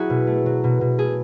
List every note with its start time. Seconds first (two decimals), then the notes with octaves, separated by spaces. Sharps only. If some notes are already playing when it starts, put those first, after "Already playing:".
Already playing: F#3 E4 F#4 G#4
0.10 B2
0.27 A3
0.46 F#3
0.64 B2
0.81 B2
0.98 A3 G#4